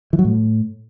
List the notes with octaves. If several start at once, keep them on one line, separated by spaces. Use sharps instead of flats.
E3
F#3
A2